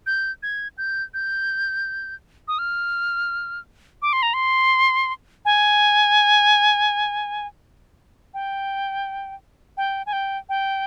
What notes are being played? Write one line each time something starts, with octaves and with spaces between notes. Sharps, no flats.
G6
G#6
G6
G6
D#6
F6
D6
C6
A#5
C6
G#5
G5
G5
G#5
G5
G5